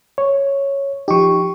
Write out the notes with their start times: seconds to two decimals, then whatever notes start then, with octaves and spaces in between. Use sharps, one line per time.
0.18 C#5
1.08 F3 D#4 G4 C#6